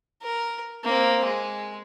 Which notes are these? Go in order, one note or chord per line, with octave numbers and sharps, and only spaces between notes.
A#4
A#3 C4
G#3